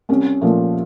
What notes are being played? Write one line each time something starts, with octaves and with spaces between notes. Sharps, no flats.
C2 C#4
A#2 F3 A3